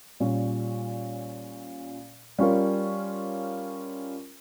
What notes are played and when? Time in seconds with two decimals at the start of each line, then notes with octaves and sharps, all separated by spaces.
0.20 A#2 G3 C#4
2.39 G3 C#4 F4 A#4